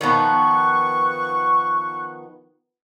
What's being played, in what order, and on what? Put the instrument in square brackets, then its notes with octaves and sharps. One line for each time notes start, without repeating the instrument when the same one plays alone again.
[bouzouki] D#3 F3 B3 [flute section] C#6 F#6